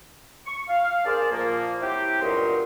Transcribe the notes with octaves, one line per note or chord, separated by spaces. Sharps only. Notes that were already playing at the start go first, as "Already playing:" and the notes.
C#6
F5
D4 G#4 A#4 C5 D5
A#2 F3 A#3
F#3 C4 E4 G4
C#2 G2 A#2 F#3 D#5 C6